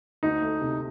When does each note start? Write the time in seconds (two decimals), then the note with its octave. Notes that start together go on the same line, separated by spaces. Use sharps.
0.23 D2 D#4
0.42 A3
0.61 C3